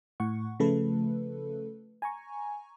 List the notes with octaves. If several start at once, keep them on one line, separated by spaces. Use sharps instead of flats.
A2 F#5 C#6
C#3 F3 A3 A4 B4
G#5 A#5 C#6